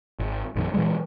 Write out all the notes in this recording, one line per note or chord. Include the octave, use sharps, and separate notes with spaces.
G#1
A#1 F#2 D#3
A#2 E3 F#3 G#3